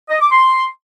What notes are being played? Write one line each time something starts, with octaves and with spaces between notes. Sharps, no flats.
D#5
D6
C6